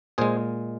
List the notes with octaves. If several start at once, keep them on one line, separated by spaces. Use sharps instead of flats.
A#2 G#3 G#4 C5